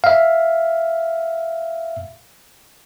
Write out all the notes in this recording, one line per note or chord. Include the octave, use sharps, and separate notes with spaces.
E5 F5